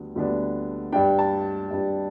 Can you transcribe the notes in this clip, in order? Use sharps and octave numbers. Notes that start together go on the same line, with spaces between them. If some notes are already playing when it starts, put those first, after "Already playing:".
Already playing: D2 D3 G3 B3 D4
D2 D3 G3 B3 D4
G2 G3 D4 G5
A5
G2 G3 D4